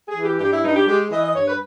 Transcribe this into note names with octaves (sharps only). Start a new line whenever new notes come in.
G#4
E3
G4
G2 G4
E4
G2 D#4
G4
G#3 G4
E3 D#5
D#5
G2 C#5
B4